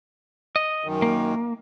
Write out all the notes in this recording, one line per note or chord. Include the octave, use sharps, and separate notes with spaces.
D#5
F#2 D#3
A#3